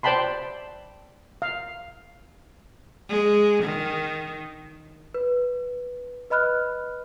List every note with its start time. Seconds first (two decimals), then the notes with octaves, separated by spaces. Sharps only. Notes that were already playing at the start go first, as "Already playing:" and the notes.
0.03 C5 D5 G5 A5 B5 C6
1.42 F5
3.09 G#3
3.64 D#3
5.14 B4
6.30 B4 D#5 B5 F6 F#6